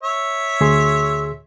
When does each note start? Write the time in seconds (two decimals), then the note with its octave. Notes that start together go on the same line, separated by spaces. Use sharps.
0.04 C#5 E5
0.61 D2 G#4 C6